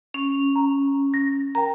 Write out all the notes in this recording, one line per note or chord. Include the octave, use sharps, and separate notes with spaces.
C#4
A#5
A#6
A#4 G5 A#5